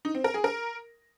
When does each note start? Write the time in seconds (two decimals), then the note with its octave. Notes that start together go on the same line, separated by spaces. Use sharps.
0.05 D#4
0.15 C4
0.24 A#4
0.34 G#4
0.44 A#4